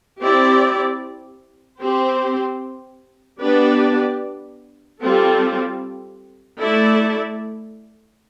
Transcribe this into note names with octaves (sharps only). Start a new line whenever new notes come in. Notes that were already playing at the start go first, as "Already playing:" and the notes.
C4 E4 G4 D5
C4 G4 C5
B3 D4 G4 B4 D5
G3 C4 F4 A4
A3 E4 A4 D5